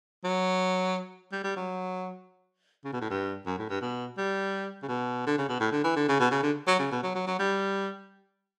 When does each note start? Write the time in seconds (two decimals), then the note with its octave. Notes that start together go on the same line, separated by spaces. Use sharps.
0.24 F#3
1.32 G3
1.44 G3
1.56 F#3
2.85 C#3
2.93 B2
3.01 A2
3.10 G2
3.46 F#2
3.59 A2
3.69 G2
3.81 B2
4.17 G3
4.82 C#3
4.88 B2
5.27 D3
5.38 C#3
5.49 B2
5.60 A2
5.72 D3
5.84 E3
5.96 D3
6.08 C#3
6.20 B2
6.31 C#3
6.43 D3
6.67 F#3
6.79 C#3
6.92 B2
7.03 F#3
7.15 F#3
7.27 F#3
7.39 G3